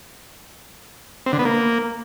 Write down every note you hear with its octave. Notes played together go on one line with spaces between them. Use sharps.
C4
D3
B3
A#3